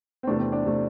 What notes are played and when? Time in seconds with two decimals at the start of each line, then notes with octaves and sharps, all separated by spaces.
0.23 C4
0.27 A3 D4
0.30 E2 C3
0.39 C4
0.52 D4
0.66 C3 A3